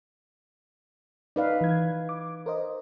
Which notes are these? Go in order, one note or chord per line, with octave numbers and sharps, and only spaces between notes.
D#4 B4 D5 F5
E3 G#6
D6
A#4 C5 D#5